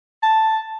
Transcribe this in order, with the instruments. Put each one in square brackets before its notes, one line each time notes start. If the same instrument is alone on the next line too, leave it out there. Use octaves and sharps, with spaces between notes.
[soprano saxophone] A5